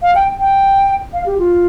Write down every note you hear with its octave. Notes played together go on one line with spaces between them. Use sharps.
F5
G5
G5
F5
G4
F4